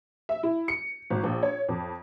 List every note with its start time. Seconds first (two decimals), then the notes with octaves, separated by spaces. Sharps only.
0.29 E5
0.43 E4
0.68 C#7
1.10 G#1
1.23 A#1
1.43 C#5
1.69 F2